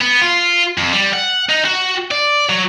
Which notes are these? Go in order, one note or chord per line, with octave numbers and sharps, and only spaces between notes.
B3
F4
F2
G3
F#5
D#4
F#4
D5
F#3